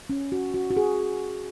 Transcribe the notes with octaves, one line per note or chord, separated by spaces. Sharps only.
C#4
F#4
F#4
F#4
G#4